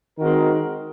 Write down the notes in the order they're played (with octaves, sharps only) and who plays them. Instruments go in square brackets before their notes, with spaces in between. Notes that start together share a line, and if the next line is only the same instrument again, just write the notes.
[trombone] D#3 [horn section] G#3 C4 F#4 A#4